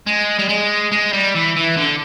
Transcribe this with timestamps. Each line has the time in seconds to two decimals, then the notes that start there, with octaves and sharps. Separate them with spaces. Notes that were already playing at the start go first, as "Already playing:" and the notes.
0.06 G#3
0.39 G3
0.49 G#3
0.91 G#3
1.13 G3
1.35 E3
1.56 E3
1.77 D3